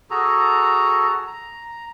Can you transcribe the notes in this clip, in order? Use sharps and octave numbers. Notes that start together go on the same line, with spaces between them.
F#4 G#4 A4 A#5
A#5